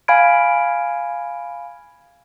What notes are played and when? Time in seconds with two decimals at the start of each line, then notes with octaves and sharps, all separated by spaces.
0.08 F5 G#5 B5 F6 G#6 D7